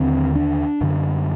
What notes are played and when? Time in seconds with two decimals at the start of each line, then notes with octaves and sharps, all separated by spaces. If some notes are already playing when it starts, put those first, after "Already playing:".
Already playing: D#2 D3 C4
0.36 D4
0.81 F#2 D3